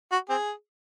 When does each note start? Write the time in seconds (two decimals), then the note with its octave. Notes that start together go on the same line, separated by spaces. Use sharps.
0.12 F#4
0.29 C4 G#4